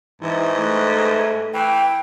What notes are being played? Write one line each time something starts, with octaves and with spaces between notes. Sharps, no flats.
G#2 E3
A3 B4
E3 G5